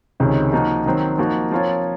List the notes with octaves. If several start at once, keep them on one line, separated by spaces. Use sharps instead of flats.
C#2 C3 D#3 G#3 C#4
F3 A#3 D#4 F#4 A#4
D#3 F#3 C4
F3 A#3 D#4 F#4
F3 C4 F4 A#4 C#5